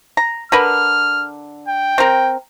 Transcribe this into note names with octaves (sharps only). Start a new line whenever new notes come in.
A#5
D3 A#4 B4 F6
G5
C4 A#4